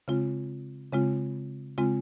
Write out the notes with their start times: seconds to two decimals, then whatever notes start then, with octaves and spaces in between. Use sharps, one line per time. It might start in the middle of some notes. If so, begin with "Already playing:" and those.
0.08 C#3 G#3 C4 F4
0.93 C#3 G#3 C4 F4
1.78 C#3 G#3 C4 F4